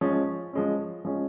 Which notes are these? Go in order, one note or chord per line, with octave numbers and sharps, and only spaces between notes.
F3 G#3 C#4
F3 G#3 C#4
F3 G#3 C#4